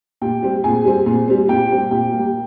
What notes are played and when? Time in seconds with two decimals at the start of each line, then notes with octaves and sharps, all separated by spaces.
0.22 A#2 G4 G5
0.43 G3 C4
0.64 A#2 G#4 G#5
0.85 G3 C4
1.06 A#2
1.28 G3 C4
1.48 A#2 G4 G5
1.70 G3 C4
1.91 A#2 G4 G5
2.12 G3 A#3